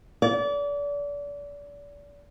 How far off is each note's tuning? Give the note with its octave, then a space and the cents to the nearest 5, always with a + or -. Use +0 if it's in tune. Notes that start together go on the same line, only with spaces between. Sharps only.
D5 -35